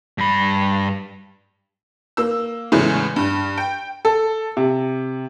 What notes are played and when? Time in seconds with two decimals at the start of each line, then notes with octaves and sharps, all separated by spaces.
0.18 G2 B5
2.17 A#3 E6
2.72 E2 A2 C#3 G#3
3.16 G2
3.57 G5
4.05 A4
4.57 C3